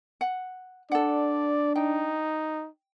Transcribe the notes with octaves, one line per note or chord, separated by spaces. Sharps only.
F#5
D4 A4 D5 F#5
D#4 G5